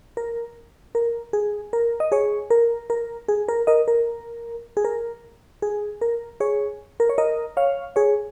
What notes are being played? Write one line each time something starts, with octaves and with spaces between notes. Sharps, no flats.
A#4
A#4
G#4
A#4
D#5
G#4 C#5
A#4
A#4
G#4
A#4
A#4 D#5
A#4
G#4
A#4
G#4
A#4
G#4 C#5
A#4
C#5
A#4 D#5
C#5 F5
G#4 C#5